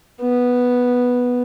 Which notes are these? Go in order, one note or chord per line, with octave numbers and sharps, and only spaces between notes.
B3